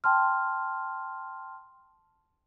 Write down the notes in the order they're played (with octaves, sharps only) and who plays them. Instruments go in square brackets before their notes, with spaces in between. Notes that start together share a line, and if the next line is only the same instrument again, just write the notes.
[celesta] G5 A5 C6 F6